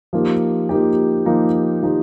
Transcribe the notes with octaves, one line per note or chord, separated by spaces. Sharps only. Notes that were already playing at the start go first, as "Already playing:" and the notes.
F3 A#3 D#4 G4
F3 A#3 D#4 G4
F3 A#3 D#4 G4
F3 A#3 D#4 G4